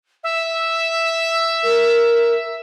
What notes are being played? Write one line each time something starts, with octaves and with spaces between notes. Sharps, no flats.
E5
A#4